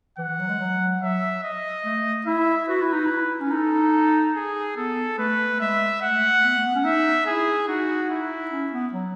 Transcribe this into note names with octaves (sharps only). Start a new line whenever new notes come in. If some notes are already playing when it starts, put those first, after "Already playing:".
E3 F#5
E3
F#3
G#3
F#3
F#3 E5
D#5
A3
E4 E5
F#4 B4
E4
D#4
E4
C#4
D#4 A4
G#4
B3 A4
A3 B4
G#3 E5
A3 F#5
B3
A3
B3
C#4
D#4 E5
E4 G#4
D#4 F#4
E4
C#4
B3
F#3